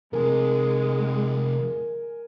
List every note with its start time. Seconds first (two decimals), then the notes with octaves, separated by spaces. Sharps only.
0.13 C3 F3 G#3 A#4 G#5